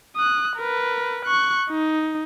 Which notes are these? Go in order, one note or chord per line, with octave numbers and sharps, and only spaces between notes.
D#6 F#6
A#4 B4
C#6 F#6
D#4